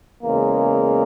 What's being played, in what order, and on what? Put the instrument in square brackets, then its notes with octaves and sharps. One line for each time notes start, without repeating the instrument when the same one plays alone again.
[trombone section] E2 C#3 G#3 A#3